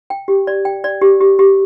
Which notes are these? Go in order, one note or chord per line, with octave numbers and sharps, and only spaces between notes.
G5
G4
D5
G5
D5
G4
G4
G4